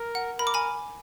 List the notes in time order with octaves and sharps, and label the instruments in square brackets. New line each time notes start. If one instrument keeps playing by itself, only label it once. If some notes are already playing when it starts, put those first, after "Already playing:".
Already playing: [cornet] A#4
[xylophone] F#5
[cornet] A#4 [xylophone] B5
[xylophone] D6
G#5 B5